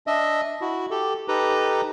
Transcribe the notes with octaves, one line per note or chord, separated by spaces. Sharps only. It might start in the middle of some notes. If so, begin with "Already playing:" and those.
D4 D#5 E5
E4 F#4
G4 A4
D#4 G4 A4 B4 A#5